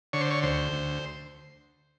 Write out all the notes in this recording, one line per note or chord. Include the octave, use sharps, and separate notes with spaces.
D3 C#5
C5
C#5
D2 C5
D2